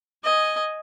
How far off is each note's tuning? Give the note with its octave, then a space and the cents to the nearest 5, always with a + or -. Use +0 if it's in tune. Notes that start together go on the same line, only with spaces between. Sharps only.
D#5 +0 G#5 +0